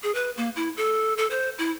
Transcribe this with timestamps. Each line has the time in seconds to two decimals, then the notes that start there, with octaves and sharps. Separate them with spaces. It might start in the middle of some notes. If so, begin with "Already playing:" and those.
0.03 G#4
0.15 B4
0.37 A#3
0.56 E4
0.77 A4
1.18 A4
1.30 C5
1.58 E4